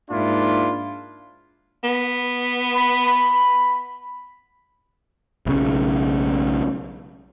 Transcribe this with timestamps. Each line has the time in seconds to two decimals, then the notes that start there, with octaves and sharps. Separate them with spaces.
0.11 G#2 A#3 D4 E4 F4
1.84 B3
2.74 B5
3.05 B5
5.46 B1 C#3